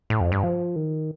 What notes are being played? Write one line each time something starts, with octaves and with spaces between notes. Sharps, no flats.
A2
F2
G2
F3
D#3